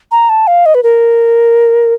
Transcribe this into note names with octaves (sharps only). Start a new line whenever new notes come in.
A#5
A5
F5
D#5
B4
A#4